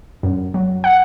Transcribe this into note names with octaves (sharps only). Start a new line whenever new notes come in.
F#2
F#3
F#5